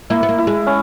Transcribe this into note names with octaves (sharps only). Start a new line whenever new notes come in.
A#3 E4
B3
A#3
E4
G#3
C#4